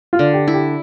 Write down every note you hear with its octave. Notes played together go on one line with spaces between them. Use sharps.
F4
D3
G4
E4
G4